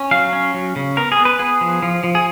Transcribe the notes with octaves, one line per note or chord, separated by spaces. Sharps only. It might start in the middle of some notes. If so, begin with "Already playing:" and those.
Already playing: C#4
F#3 F5
C#4
F#3
C#3
B3 A#4
G#4
B3
B4
B3 G#4
F3
F3
F3
G#4